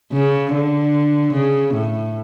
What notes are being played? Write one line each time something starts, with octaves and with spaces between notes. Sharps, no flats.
C#3
D3
C#3
A2